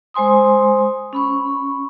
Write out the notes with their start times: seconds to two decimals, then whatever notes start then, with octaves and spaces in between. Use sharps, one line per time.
0.14 G#3 C5 G#5 C6 D#6
1.13 C#4 B5 C#6